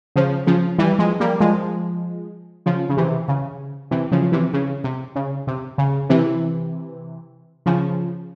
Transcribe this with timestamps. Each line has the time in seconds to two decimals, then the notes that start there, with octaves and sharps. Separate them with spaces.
0.16 C#3 F3
0.47 C#3 F3
0.78 E3 G3
0.99 F3 G#3
1.20 G3 A#3
1.40 F3 G#3
2.66 C#3 F3
2.89 C#3
2.97 C3 E3
3.28 C#3
3.91 C3 E3
4.11 C#3 F3
4.22 F3
4.32 C3 E3
4.53 C#3
4.84 C3
5.16 C#3
5.47 C3
5.78 C#3
6.09 C3 E3
7.66 C#3 F3